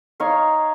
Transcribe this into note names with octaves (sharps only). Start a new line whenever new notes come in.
D#4 C#5 F5